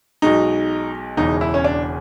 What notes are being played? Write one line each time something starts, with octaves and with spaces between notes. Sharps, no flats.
B1 B2 G#3 D#4
E1 E2 C#3 E3 D#4
E4
C#4
D4